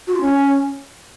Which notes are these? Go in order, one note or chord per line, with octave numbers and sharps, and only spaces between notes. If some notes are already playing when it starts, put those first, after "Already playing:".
F#4
F4
C#4